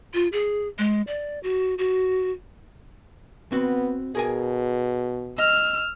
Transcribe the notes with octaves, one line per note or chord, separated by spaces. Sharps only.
F4
G#4
G#3
D5
F#4
F#4
B3 C4 F#4
B2 G#4 A#4 G#5
D#5 E6 F6